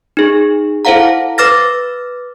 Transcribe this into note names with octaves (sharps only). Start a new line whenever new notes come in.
D#4 G#4
E4 A4 C5 F5 F#5 A#5
B4 D6 F6 A6 A#6